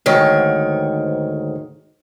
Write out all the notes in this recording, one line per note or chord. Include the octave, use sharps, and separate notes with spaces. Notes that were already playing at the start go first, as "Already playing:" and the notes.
D2 G#2 D#3 C#5